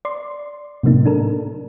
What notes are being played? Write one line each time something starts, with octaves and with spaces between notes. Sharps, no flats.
D5 C6
A2 C3 F#3 A#3 D#4
D4 A4 A#4